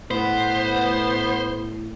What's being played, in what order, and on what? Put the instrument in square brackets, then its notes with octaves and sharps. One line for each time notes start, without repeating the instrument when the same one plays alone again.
[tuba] A2 [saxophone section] B3 [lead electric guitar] C5